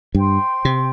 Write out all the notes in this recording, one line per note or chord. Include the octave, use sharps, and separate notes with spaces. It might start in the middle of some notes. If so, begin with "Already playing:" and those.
G2 C5 G5 C6
C3